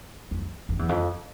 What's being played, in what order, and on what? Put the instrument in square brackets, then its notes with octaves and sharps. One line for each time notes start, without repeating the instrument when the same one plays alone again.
[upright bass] F2
F2
E2
F2